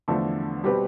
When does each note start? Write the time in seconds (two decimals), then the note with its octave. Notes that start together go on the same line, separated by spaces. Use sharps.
0.08 E2 D3 F3 A3 D4
0.63 B2 G3 C4 G4 B4